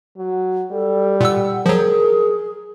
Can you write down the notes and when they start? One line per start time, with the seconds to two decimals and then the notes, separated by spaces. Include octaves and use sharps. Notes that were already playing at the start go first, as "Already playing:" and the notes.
0.17 F#3
0.71 G3 A4
1.21 A#2 F#5 E6
1.66 F3 F#3 G#4 A#4